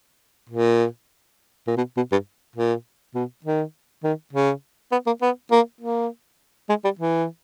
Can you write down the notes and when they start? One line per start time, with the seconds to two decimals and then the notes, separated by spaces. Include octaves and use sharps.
0.49 A#2
1.67 A#2
1.77 B2
1.97 B2
2.12 G2
2.56 A#2
3.15 B2
3.45 D#3
4.04 D#3
4.33 C#3
4.92 B3
5.07 A#3
5.22 B3
5.52 A#3
5.81 A#3
6.69 G#3
6.85 G3
6.99 E3